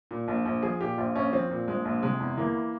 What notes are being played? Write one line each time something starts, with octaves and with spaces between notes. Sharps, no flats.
A#2
A#1
A#1
F3 G#4
A#2 G4
A#1 F4
A#1 C#4
F3 C4
A#2
A#1 G#3
A#1
C3 G#3
E2
E3 A#3